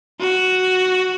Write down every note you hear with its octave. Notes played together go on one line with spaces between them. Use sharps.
F#4